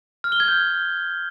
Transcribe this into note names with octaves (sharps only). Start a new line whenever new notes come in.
F6
G7
G#6
G6